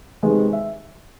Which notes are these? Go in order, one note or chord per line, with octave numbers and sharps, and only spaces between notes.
C3 D#3 G#3 B3
E5